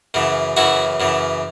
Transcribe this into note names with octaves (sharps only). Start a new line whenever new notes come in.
F#2 C#3 E3
F#2 C#3 E3 E4 F#4
F#2 C#3 E3